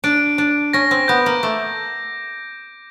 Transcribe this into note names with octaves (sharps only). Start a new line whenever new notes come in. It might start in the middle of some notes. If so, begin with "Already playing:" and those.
D4 D7
D4 D7
C#4 A#6
C4
B3 G6
A#3
A3 D6